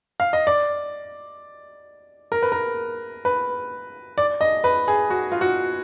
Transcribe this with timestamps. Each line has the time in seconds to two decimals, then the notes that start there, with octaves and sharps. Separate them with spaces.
0.20 F5
0.33 D#5
0.47 D5
2.32 A#4
2.42 B4
2.52 A#4
3.25 B4
4.18 D5
4.41 D#5
4.64 B4
4.88 G#4
5.10 F#4
5.32 F4
5.41 F#4